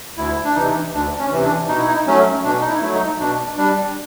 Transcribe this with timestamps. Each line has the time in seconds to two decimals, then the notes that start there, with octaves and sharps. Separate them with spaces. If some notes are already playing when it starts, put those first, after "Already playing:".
0.17 D2 E4
0.44 D4
0.55 C3 E3 D#4
0.93 D2 D4
1.19 C#4
1.32 C3 E3
1.44 D4
1.68 B2 D#4
1.78 E4
1.87 D#4
2.07 F#3 A3 C#4
2.44 B2 D4
2.61 D#4
2.69 E4
2.82 F#3 A3
2.94 D#4
3.20 B2 D4
3.58 G3 D4